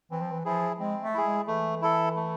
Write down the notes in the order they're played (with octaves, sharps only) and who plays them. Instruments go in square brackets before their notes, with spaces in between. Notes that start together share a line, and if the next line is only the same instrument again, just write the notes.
[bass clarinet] E3 [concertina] C4
[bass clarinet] F3
E3
[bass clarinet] F3 [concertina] E4 G#4
[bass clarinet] G#3 [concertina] C4
[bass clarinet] A3
[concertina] E4 G#4
[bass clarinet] G#3
[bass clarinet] E3 [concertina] A3
[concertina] E4 A4
A3